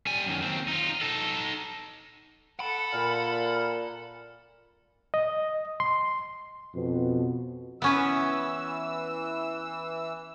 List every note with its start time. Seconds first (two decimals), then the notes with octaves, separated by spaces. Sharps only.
0.06 G3 G#5
0.26 F#2 D#3
0.42 D#2 C4
0.68 D#4 F4
1.01 D#4 A4
2.60 A4 F#5 B5
2.93 A#2 F5
5.14 D#5
5.80 C6
6.75 F2 B2
7.82 E3 B3 C#4 B4 E6